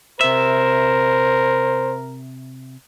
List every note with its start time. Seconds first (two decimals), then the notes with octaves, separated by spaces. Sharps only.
0.21 C3 A#4 C5 E5